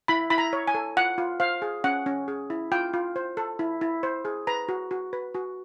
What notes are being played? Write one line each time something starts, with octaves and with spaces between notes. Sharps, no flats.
E4 B5
E4 B5
A#5
C#5
G#5
A4
F4 F#5
F4
C5 F5
G#4
C#4 F#5
C#4
G#4
E4
F4 G5
F4
C5
A4
E4
E4
C5
G#4
B4 A#5
F#4
F#4
B4
F#4